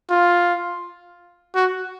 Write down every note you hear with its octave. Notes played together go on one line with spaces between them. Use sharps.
F4
F#4